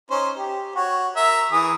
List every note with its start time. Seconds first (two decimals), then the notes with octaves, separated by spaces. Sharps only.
0.11 C#4 D#4 C5
0.37 G4
0.76 F#4 C#5
1.16 A#4 E5
1.52 E3 G#4 D#6